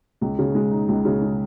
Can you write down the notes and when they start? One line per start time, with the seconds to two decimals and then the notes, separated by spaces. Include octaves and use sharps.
0.21 C#2
0.39 C#3
0.55 G#3
0.71 D#4
0.88 C#2
1.05 C#3
1.22 G#3